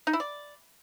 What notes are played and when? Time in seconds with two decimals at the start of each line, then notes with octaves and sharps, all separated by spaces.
0.07 D#4
0.13 E4
0.20 D5